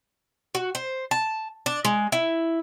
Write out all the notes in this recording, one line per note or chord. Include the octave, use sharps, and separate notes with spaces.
F#4
C5
A5
D4
G#3
E4